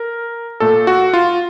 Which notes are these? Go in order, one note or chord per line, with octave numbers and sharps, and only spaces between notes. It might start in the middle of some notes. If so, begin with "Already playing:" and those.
Already playing: A#4
A#2 A3 A4
F#4
F4